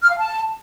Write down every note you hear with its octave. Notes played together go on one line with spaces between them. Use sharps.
F6
F5
A5